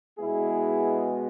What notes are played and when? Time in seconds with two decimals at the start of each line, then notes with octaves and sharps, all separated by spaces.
0.18 B2 G#3 B3 E4 G#4